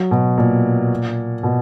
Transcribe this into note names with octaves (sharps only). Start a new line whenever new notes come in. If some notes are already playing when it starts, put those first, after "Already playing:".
Already playing: F#3
B2
A#2
B2